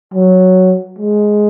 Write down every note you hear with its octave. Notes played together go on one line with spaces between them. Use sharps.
F#3
G#3